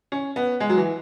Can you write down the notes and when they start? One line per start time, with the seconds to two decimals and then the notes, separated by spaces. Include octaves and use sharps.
0.12 C#4
0.36 B3
0.60 G#3
0.69 F#3
0.78 E3